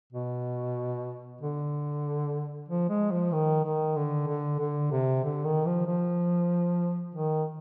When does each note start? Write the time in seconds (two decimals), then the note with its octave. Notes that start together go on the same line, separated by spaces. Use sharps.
0.13 B2
1.41 D3
2.68 F3
2.89 G#3
3.11 F3
3.32 D#3
3.64 D#3
3.96 D3
4.27 D3
4.59 D3
4.91 C3
5.24 D3
5.44 D#3
5.66 F3
5.87 F3
7.15 D#3